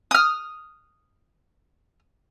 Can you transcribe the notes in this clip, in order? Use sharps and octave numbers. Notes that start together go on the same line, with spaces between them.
D#6 F6